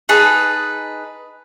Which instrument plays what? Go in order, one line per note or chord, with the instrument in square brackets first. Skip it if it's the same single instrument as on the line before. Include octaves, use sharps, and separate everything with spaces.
[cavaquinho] D#4 G#4 B4 A5